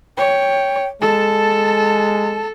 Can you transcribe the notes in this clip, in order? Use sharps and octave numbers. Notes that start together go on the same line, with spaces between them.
C#5 G5
G#3 A4 A5